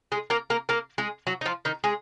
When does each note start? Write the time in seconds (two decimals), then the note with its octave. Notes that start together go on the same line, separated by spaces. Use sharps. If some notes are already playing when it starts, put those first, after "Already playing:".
0.12 G#3 G#4
0.30 A#3 A#4
0.50 A#3 A#4
0.69 A#3 A#4
0.98 G#3 G#4
1.27 F#3 F#4
1.41 D#4
1.46 F3 F4
1.65 D#3 D#4
1.84 G#3 G#4